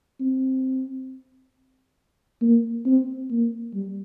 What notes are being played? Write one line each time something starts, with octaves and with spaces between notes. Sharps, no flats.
C4
A#3
C4
A#3
G3